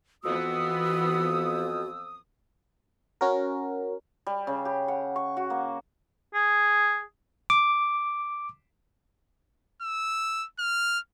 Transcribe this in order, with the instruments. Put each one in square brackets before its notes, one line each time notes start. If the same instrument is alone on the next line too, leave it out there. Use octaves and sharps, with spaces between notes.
[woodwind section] F2 D#6 [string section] E3 B3 [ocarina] F#4 [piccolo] E6
[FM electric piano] C#4 F#4 A#4
[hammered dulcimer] G3
C#3
G4
F#5
C#6
F#4
A#3
[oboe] G#4
[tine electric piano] D6
[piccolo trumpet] E6
F6